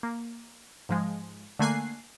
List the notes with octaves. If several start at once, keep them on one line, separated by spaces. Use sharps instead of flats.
A#3
G#2 F3 G#3
D3 A3 A#3 G#5 F#6 C7